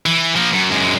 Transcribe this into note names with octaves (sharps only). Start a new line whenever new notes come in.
E3
F3 A#3
F#2
F#2 G#3